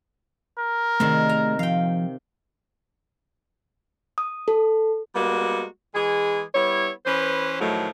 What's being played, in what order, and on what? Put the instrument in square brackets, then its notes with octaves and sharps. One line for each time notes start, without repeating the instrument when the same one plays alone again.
[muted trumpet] A#4
[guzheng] C3 D#3 [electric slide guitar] A3 G#4 D5
[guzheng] A#5
[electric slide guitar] F3 [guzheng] F5 G5
[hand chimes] D#6
A4
[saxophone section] G3 G#3 A#3 B3 F#4
E3 G#3 G#4
G3 B3 E4 C#5
E3 C#4 B4 C5
A2 D#3 F3 F#3 A3